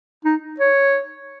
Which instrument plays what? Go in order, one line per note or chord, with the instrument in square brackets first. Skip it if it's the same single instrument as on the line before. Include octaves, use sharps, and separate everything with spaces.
[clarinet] D#4
C#5